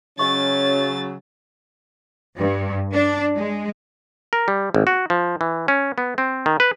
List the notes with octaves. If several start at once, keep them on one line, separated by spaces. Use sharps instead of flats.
C#3 F#3 C#4 D#5 C#6 A6
G2
D4
G#3
A#4
G3
G#1
F#4
F3
E3
C#4
B3
C4
D#3
B4